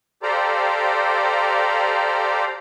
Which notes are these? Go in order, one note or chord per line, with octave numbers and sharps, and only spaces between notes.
G4 A4 C5 D5 F5 A#5